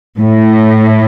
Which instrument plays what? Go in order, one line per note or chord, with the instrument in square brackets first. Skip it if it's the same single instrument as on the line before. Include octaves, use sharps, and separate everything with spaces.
[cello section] A2